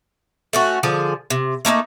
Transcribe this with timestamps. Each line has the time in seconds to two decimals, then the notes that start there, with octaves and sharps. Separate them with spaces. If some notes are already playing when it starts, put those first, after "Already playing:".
0.53 A3 C#4 F#4
0.83 D3 F3 G#4
1.30 C3
1.65 A3 A#3 C#4 D#4